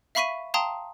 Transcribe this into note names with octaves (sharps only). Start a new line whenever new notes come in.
E5 F5 B5 C#6 B6 D#7
F5 G5 A5 A#5 C6 D#6